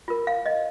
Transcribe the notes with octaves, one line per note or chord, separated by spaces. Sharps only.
F4 A#4
F5
D#5